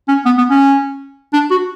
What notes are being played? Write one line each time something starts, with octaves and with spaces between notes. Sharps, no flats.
C#4
B3
B3
C#4
D4
F#4